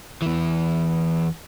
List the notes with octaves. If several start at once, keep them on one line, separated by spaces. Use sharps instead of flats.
E2 E3